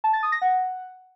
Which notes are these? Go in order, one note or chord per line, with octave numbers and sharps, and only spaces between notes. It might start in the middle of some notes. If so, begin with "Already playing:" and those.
A5
A6
D#6
A#6
F#5